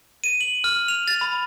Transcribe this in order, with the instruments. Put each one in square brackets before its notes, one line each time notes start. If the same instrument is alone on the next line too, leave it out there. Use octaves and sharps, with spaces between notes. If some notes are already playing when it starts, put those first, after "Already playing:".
[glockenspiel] D#7
F#7
F6
F7
A6
B5